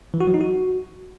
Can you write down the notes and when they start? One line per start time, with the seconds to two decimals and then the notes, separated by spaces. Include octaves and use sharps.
0.14 E3
0.21 F#4
0.27 F#3
0.34 D#4
0.41 F#4